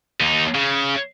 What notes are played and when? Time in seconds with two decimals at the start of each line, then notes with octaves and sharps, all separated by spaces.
0.20 D#2 D#4
0.55 C#3